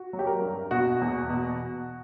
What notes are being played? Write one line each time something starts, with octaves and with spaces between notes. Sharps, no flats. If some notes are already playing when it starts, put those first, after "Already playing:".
Already playing: F#4
F#3
G4
A#4
G2
B2 F#4
E2
B2